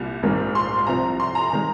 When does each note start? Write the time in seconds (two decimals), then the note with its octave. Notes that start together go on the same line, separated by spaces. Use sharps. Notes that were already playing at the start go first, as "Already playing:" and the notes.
Already playing: C2 A#2 G3
0.23 A#1 G#2 D#3 G3 A#3
0.55 C6
0.87 C2 C3 F3 A#5
1.20 C6
1.35 A#5
1.50 D#3 G#3 A#5